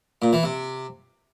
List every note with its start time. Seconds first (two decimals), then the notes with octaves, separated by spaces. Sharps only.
0.22 A#2
0.33 E3
0.43 C3